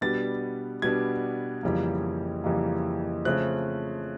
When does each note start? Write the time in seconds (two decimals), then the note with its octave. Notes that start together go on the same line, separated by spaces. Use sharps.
0.01 B2 G3 B3 D4 A6
0.82 B2 G3 B3 D4 G#6
1.63 F2 C#3 E3 G3 A#3
2.44 F2 C#3 E3 G3 A#3
3.25 C#3 F3 A3 C4 F#6